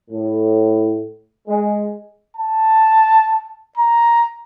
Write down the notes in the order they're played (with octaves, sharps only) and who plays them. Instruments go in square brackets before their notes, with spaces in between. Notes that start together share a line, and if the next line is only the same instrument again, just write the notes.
[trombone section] A2
G#3
[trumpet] A5
A#5